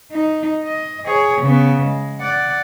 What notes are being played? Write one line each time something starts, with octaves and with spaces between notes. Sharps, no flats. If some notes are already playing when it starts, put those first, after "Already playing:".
D#4
D#5
G#4 C#5
C#3 B3
G#3
D5 F#5